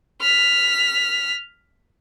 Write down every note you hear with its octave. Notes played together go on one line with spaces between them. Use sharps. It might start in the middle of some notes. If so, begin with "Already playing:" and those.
F6 B6